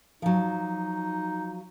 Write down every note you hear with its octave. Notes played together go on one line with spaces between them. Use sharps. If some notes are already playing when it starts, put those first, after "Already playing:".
F3 F#3 D#4